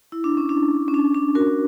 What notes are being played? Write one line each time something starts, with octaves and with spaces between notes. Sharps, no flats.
E4
D4
C#4
D4
C#4
D4
D4
F#4 A#4